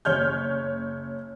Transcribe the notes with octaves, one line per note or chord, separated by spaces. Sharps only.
F#1 C#5 F6 G6